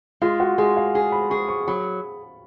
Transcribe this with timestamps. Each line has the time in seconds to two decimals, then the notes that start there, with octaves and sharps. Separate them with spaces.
0.21 G#3 F4
0.40 F#4
0.58 G#3 G#4
0.77 F5
0.95 G#4 G#5
1.12 B5
1.30 G#4 C#6
1.48 C#6
1.68 F#3 B5